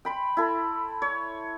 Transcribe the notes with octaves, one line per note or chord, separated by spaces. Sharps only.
G5 B5 C6
E4 A4
C#5